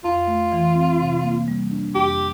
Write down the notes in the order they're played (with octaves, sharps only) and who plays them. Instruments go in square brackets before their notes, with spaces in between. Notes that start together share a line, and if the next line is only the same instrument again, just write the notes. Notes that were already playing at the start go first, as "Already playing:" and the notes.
[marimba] F2 [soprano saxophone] F4
[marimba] A3
E3
C4
C3
A#3
G3
D4
[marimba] F2 [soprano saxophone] G4